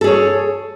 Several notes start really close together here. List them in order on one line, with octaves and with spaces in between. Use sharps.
A4 G#4 C#5